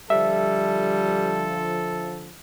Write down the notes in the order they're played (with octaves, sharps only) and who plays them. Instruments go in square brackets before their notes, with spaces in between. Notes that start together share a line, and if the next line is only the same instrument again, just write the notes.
[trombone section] D3 F3 [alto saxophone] G3 [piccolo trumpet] A4 [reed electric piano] E5